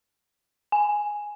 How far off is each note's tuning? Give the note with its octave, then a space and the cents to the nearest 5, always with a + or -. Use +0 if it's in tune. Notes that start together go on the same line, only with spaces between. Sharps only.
G#5 +0